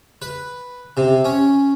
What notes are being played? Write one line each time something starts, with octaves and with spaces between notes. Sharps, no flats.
B4
C3
C#4